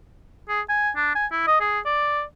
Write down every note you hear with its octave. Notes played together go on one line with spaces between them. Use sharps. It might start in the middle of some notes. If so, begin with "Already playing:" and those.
G#4
G#5
D4
G#5
E4
D#5
G#4
D5